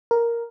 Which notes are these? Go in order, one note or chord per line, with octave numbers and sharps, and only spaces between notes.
A#4